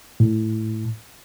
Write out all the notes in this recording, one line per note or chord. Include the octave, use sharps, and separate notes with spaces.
A2